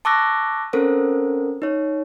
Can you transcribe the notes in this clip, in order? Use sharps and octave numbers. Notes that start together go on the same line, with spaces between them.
A5 C#6 D6 E6 F#6 A#6
C4 C#4 A4 A#4 C5
D#4 C#5